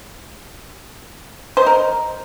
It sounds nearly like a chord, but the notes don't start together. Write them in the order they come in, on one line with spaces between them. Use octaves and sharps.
C5 D#5 A#4